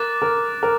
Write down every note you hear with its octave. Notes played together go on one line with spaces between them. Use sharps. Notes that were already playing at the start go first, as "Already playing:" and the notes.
Already playing: A#4 D6 F#6 A6
A#4
A#4